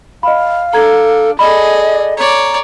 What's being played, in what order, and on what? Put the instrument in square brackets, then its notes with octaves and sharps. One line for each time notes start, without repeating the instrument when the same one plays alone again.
[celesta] D#5 B5 [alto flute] F5
[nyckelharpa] D4 [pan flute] A4 [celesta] A#5 G#6
[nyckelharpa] G#4 A4 [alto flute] D5 [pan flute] D#5 [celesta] B5
[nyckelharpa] C#5 D5 [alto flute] A#5